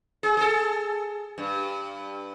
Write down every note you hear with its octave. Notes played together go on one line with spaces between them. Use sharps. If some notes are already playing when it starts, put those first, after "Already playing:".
G#4
G#4 A4
G2